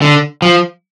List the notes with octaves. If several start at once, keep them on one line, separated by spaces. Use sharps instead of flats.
D3
F3